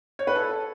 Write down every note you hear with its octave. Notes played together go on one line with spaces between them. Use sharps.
C#5
B4
A4